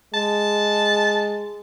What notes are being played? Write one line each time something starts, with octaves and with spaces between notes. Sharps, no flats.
G#3 A5